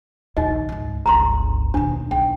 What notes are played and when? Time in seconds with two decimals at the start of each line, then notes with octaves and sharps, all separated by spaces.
0.37 A#1 D#2 D#4 D#5
0.69 C#2 G#2
1.06 G1 C#2 A#5 C6
1.74 D#2 B2 D4
2.11 B1 G5